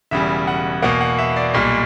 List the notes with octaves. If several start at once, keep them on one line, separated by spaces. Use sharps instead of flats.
E1 E2 C#3 G3 E5
F#5
E2 B2 A#3 F#5
F#5
E5
D5
B1 A#2 G3